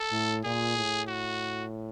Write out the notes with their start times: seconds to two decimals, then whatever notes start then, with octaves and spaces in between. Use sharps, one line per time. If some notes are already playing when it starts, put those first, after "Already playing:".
Already playing: A4
0.12 A2
0.44 A#2 G#4
0.76 A2
1.08 F#4